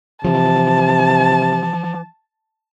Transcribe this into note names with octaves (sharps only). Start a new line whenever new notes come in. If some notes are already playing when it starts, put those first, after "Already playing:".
C3 E3 F3 A5